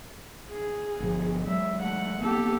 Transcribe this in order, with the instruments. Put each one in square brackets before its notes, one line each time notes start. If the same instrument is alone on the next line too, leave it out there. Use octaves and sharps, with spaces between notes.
[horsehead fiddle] G#4
[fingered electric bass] G1 B2 F3
[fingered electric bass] F#3 G#3 [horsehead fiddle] E5
[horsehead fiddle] A3 F#5
[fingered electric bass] A#3 B3 [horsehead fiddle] G4 A4